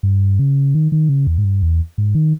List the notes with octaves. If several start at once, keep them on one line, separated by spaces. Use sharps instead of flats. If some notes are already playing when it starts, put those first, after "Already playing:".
G2
C#3
D#3
D#3
C#3
E2
G#2
G2
E2
G#2
D#3